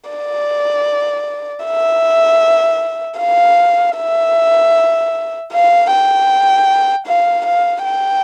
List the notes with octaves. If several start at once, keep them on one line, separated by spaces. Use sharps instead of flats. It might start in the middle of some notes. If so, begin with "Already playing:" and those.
D5
E5
F5
E5
F5
G5
F5
F5
G5